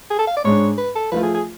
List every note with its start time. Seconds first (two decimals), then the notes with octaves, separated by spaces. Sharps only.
0.11 G#4
0.19 A4
0.27 F5
0.37 D5
0.44 G#2 G#3 D4 C#5
0.78 B4
0.96 A4
1.12 F3 A3 F4 B4
1.23 G#4
1.34 G#4